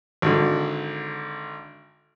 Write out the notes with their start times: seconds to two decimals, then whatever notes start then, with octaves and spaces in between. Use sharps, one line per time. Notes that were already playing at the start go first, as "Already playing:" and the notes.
0.22 G#1 D3